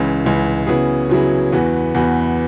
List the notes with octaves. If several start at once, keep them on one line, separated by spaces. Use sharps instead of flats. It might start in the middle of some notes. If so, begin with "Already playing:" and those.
Already playing: C#2 C#3 E3
C#2 C#3 E3
C#3 F#3 B3 E4 G#4
C#3 F#3 B3 E4 G#4
E2 E3 B3 F#4 B4
E2 E3 B3 F#4 B4